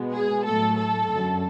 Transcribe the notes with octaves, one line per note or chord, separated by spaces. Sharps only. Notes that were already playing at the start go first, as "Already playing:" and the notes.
Already playing: B2 G#3 B3
G#4
A2 F#3 A3 A4
A4
F#2 D3 F#3